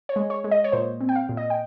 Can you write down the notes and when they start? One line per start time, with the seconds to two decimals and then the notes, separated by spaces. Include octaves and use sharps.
0.09 C#5
0.16 G#3
0.30 C#5
0.44 G#3
0.51 D#5
0.64 C#5
0.72 A#2 C5
1.01 C4
1.09 G5
1.15 F5
1.29 A#2
1.37 D#5
1.50 G5